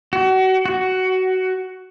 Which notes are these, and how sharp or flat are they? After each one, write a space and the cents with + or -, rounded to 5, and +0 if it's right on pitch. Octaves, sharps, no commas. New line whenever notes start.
F#4 +30
F#4 +15